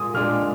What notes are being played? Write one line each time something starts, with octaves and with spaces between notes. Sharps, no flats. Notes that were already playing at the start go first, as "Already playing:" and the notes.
Already playing: A#2 G#3 D#6
A#2 G#3 D4 F6